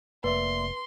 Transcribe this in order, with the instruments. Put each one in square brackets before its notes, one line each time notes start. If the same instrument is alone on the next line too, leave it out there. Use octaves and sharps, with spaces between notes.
[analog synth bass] F1 [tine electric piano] A#3 D5 E5 [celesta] B4 [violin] C6